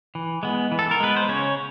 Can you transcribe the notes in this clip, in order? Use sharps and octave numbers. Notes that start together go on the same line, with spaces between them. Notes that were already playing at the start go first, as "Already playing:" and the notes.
E3
G#3 B3
E3
A4
A#4
G#3 B3 B4
C5
C#3 C#4 C#5